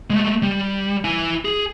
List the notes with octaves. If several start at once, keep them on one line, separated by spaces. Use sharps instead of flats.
G#3 A3
G3
E4 G#5
G#4